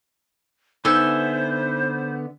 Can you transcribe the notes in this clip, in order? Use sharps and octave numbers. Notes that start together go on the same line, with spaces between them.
D3 B3 D#4 C5 E5 G#5 G6 G7